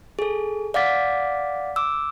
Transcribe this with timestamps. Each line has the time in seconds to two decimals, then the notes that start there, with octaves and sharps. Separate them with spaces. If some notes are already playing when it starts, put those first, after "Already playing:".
0.19 G#4 A4
0.74 D5 F5 F#5 D6 A6 B6
1.76 D6 E6